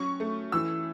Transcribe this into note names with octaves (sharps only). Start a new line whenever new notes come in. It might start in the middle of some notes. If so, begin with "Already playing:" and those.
Already playing: F#3 C#4 C#6
A3
E3 E6